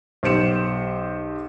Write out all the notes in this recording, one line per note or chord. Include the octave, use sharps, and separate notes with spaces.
B1 G4 C5 C#7 E7